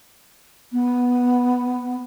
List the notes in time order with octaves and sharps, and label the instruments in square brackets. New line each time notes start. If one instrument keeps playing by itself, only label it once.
[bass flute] B3